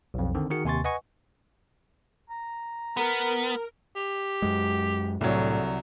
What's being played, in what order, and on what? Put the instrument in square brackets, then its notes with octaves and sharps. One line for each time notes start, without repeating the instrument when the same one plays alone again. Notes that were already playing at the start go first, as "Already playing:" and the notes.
[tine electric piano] B1 F2
D3 D#3 C4
D#3 F#4 G#4 A#4 C#7
D#2 C3 G#5 C6 C#6 A6
B4 D#5 F#5 G#5 C#6
[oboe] A#5
[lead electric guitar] B3 [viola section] A#4
[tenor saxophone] G4
[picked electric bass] F#2 G#3
[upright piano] C2 F#3 [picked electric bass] A2 [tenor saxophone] D3